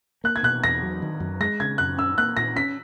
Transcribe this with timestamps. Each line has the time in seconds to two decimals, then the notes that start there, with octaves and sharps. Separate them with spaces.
0.24 A#3 F#6
0.36 G#6
0.43 B2 F#6
0.64 E2 A#6
0.83 F#3
1.02 D#3
1.20 F#2
1.40 G#3 A#6
1.60 C#3 G#6
1.78 F#2 F#6
1.97 C#4 E6
2.18 A#3 F#6
2.37 A#2 A#6
2.56 C#4 B6